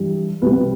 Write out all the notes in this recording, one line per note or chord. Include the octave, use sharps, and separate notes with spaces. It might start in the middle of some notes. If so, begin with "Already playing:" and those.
Already playing: G2 E3 G3
C2 B2 G3 B4